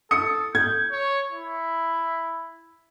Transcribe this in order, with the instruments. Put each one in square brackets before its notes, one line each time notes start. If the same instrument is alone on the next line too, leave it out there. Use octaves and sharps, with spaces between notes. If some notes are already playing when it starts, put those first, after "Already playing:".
[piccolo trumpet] A4 [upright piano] D#6 C#7
[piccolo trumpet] G6 [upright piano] G#6
[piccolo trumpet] C#5
E4